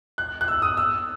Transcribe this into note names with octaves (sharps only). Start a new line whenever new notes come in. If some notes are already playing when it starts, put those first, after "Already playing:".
F#6
F#6
E6
D#6
E6